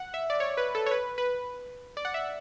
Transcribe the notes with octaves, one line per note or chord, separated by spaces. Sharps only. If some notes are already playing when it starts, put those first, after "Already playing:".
Already playing: F#5
E5
D5
C#5
B4
A4
C#5
B4
B4
D5
F#5
E5